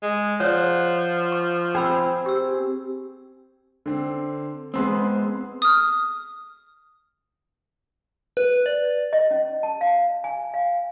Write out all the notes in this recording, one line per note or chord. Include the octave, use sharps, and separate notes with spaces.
G#3
F3 C#5 D5 F#5
C#6
C4 G#4 G5 B5 E6
G4 E6
D3 C4
G#3 B3 C4 G#4 C6 E6
D#6 F6
B4
D5
D#5
C#4
A5
F5
G#5
F5